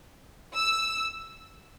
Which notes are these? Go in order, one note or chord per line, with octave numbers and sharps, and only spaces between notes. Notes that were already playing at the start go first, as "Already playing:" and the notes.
E6